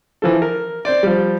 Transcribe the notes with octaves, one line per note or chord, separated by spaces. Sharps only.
E3 F3 A4
A#4
C4 C5 D5
F3 G3